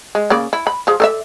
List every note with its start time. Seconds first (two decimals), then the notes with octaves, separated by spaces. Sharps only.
0.15 G#3
0.30 C#3 A#3 D5
0.53 E4
0.67 B5
0.87 F3 G#4
1.00 A4 D5 E5